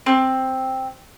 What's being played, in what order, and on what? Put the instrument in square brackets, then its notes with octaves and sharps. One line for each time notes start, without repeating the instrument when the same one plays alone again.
[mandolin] C4